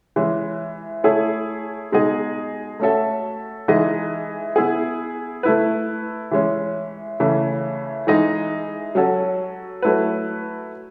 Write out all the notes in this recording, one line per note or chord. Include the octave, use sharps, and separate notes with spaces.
E3 G#3 C#4
A3 E4 G#4 C#5
B2 G#3 D#4 G#4 D#5
A3 C#4 F#4 A4 E5
E3 G#3 D#4 G#4 D#5
B3 E4 G#4
A3 E4 B4
E3 G#3 C#4
C#3 E3 A3
E3 G#3 D#4 G#4 D#5
F#3 C#4 F#4 A4
F#3 A3 E4 B4